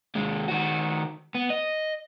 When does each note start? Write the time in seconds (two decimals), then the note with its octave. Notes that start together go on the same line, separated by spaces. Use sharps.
0.15 D#2 G#3
0.48 D#3 F#4
1.35 B3
1.50 D#5